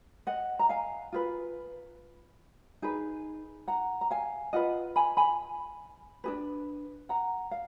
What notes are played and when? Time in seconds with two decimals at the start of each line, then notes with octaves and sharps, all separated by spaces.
0.27 D#5 F#5
0.59 A#5
0.69 F5 G#5
1.12 F4 G#4 B4
2.82 D#4 G#4 B4
3.68 F#5 A#5
4.01 A#5
4.11 F5 G#5
4.53 F4 B4 D#5 F#5
4.96 G#5 B5
5.17 G#5 B5
6.24 D4 G#4 B4
7.09 F#5 A#5
7.51 F5